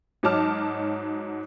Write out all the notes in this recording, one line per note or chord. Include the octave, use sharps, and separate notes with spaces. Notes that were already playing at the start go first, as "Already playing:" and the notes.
G#2 F#3 D#4 A5 D6 F6